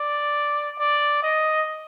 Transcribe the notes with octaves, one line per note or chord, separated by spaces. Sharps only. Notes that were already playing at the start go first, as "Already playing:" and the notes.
Already playing: D5
D5
D#5